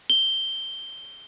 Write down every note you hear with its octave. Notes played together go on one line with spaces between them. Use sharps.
G7